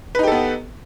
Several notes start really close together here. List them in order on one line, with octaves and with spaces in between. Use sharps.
B4 D#4 G4 A4 B3